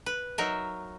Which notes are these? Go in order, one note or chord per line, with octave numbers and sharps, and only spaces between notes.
B4
F#3 D#4 A#4 E5